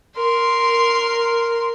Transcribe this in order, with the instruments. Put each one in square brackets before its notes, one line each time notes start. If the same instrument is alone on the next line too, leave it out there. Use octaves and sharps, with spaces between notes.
[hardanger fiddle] A#4 C6